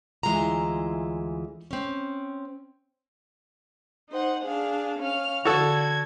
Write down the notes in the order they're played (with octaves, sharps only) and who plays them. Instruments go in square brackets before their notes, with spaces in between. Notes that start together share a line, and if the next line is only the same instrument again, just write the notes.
[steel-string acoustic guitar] D2 E3 G#3 E4 F4 A#5
C4 C#4
[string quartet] D#4 C5 F#5
D4 G#4 F5
C#4 F5 F6
[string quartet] D3 G#6 [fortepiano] F#4 A4